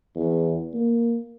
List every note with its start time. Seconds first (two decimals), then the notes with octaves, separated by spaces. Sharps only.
0.16 E2
0.74 A#3